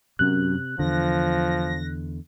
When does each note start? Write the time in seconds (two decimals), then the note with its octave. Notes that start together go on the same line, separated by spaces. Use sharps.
0.19 F#2 C3 F#6
0.79 E2 D3 F3 A#6